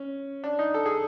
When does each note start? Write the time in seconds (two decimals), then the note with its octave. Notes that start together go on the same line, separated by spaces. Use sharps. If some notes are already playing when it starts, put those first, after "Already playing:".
Already playing: C#4
0.44 D4
0.59 D#4
0.74 A4
0.86 G#4